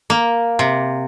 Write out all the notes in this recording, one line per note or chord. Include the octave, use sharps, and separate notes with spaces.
A#3
C3